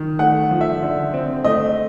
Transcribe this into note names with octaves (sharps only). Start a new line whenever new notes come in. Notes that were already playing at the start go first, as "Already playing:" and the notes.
Already playing: D#3
A3 F#5
F3
E5
D3
C4
A3 D#5